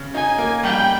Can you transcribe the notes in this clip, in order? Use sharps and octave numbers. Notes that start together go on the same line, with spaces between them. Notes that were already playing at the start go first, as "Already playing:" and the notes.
Already playing: C#3
D#4 G#5
A#3
G3 G5